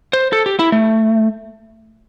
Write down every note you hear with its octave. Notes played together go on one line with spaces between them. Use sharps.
C5
A4
G4
E4
A3